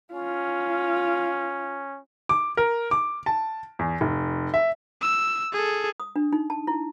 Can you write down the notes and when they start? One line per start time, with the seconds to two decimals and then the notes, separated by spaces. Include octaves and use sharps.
0.13 C#4 F4
2.29 D6
2.57 A#4
2.91 D6
3.26 A5
3.79 E2
4.01 F1
4.54 E5
5.02 E6
5.53 G#4 A4
6.00 D#6
6.16 D4
6.33 D#4
6.50 A5
6.67 E4